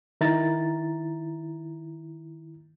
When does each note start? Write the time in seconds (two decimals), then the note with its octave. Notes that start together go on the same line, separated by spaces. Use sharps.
0.21 D#3 E4 A#5 A6